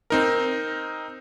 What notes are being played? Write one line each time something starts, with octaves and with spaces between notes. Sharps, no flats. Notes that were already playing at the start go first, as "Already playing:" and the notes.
C4 D#4 A#4